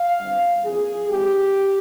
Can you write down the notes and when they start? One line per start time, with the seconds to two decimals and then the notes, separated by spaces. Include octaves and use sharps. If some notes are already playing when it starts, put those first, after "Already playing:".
Already playing: F5
0.20 G1 G2 G3 C4
0.65 G1 F2 E3 A#3 G#4
1.10 G#1 G#2 E3 G#3 C4 G4